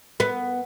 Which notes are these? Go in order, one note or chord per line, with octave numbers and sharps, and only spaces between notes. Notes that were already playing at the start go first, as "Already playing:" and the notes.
B3